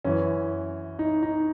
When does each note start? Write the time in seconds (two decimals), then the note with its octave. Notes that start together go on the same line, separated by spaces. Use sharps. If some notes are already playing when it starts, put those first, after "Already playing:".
0.05 F#2 E3 C#4
0.99 D#4
1.23 D#4